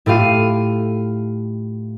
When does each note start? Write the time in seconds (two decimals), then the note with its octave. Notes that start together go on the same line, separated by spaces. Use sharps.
0.06 A2 A3 F4 G4 F5 D#7